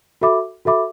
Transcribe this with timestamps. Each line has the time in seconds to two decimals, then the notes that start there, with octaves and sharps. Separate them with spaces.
0.21 F#4 A4 E5 B5 D6
0.65 F#4 A4 E5 B5 D6